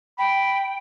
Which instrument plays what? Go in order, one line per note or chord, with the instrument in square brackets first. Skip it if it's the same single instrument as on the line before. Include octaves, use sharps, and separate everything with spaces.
[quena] G5 [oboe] B5